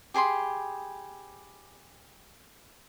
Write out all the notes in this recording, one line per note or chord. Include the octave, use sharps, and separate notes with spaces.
G4 G#4 B5 C6